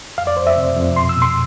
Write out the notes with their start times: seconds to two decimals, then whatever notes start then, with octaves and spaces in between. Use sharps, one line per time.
0.18 F2 F5
0.27 D5
0.37 F2 C5
0.47 E5
0.56 C3
0.77 F2
0.96 B2 C6
1.09 E6
1.16 B2
1.22 C6